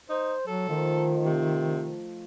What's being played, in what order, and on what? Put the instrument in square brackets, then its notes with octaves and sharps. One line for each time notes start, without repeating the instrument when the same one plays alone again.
[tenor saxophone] D#4 [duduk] C5
[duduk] F#3 [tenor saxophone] A4
[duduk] D#3 [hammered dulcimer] F3 A3 D#4
[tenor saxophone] C3